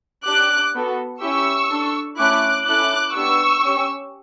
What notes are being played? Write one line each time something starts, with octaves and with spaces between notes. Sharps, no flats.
D4 G4 D6 F#6
B3 F#4 A4
C#4 E4 G4 C#6 E6
D4 A4
A3 C#4 E4 D6 F#6
C#4 E4 A4 D6 F#6
B3 D4 G4 C#6 E6
C#4 G4